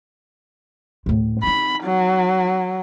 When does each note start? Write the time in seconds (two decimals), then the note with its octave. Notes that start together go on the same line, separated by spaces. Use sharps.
1.06 D2 A2
1.43 C4 D#4 B5
1.84 F#3